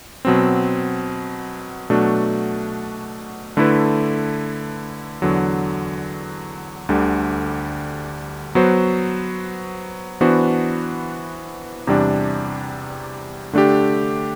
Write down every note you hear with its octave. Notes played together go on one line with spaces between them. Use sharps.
B2 F#3 C4
B2 F#3 A3 D4 F#4
D3 A3 E4 B4
E2 D3 F#3
D2 D3 G3
F#3 B3 F#4 C5
E3 B3 D4 F#4 C5
E2 C3 G3 D4
D3 A3 D4 G4